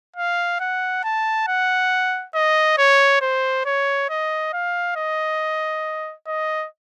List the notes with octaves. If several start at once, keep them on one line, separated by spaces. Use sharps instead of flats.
F5
F#5
A5
F#5
D#5
C#5
C5
C#5
D#5
F5
D#5
D#5